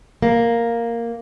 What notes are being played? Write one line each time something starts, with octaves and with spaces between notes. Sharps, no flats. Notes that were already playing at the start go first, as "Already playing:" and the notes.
A#3